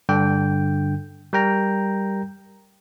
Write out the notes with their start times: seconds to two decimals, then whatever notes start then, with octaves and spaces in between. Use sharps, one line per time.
0.09 G2 D3 G5
1.33 G3 A#4 G5 A#5